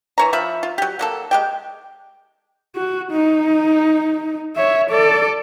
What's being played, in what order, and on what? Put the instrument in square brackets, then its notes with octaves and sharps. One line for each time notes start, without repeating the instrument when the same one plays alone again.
[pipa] E3 C#5 A#5
F3 E5 B5
F4
F#3 G4
F#3 A#3 A4
G#3 G4 G5
[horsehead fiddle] F#4
D#4
C#5 E5
A4 D5